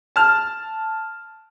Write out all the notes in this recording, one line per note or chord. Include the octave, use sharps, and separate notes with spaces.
A5 F6